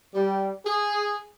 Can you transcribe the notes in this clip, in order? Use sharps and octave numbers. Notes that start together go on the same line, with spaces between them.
G3
G#4